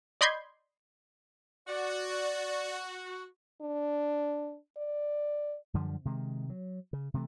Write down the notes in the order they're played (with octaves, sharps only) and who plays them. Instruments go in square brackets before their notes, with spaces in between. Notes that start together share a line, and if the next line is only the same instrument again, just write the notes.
[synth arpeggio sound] D5 D#5 B5 C6 G6 G#6
[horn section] F#4 [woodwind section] D5
[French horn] D4
D5
[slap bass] F#2 D3 F3 G3
C3 D#3 G#3
F#3
C#3
C3 E3 G3 A3